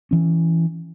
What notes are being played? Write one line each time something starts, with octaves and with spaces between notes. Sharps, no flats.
E3 C#4